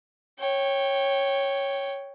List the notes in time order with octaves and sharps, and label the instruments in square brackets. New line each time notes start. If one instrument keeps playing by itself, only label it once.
[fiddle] C#5 G5